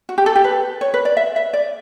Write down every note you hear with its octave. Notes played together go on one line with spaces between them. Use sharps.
F#4
G4
A4
G4
B4
C#5
B4
D5
E5
E5
D5